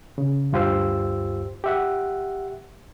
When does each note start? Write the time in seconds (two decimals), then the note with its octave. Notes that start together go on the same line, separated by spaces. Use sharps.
0.18 C#3
0.52 D2 G2 F4 G4 C5 E6
1.64 G4 E5 F#5